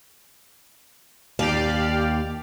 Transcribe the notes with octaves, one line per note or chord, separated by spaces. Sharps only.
D#2 G4 D5 F5